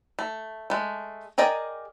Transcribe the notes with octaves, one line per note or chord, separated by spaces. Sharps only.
A3
G#3 A3
G#4 A#4 D5 D#5 G5